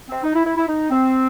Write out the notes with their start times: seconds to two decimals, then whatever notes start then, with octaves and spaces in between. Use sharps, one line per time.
0.09 C4
0.23 D#4
0.35 E4
0.45 E4
0.57 E4
0.68 D#4
0.90 C4